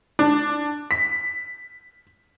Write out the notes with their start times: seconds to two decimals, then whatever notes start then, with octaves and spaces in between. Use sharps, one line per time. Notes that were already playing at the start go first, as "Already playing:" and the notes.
0.19 D4
0.91 B6